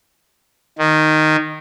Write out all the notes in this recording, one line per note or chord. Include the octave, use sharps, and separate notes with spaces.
D#3